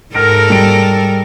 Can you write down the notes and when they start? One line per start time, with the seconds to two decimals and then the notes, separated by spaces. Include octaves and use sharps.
0.15 G#2 A4 A#4 F6 A#6 D7
0.50 G3 D7